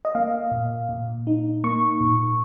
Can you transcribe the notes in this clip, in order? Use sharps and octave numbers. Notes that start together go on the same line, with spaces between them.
D#5
A#3 F5
A#2
A#2
D#4
A#3 C#6
A#2